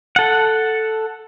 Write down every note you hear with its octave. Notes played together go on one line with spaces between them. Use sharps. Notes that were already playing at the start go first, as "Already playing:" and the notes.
A4 F#5